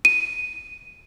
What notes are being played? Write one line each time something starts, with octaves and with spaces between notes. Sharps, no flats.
D#7